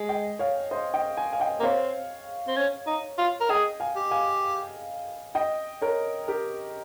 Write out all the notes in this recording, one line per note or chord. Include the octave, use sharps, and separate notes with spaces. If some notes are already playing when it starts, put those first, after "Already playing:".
Already playing: G#3 G#5
D#5 G5
C#5 F5
C5 D#5
D#5 G5
G#5
F5 G#5
D#5 G5
A#3
C4 C#5 F5
C4
C#4
D#4
F4
A#4
G#4 D#5 G5
F5 G#5
G4
F5 G#5
D#5 G5
A#4 C#5
G4 A#4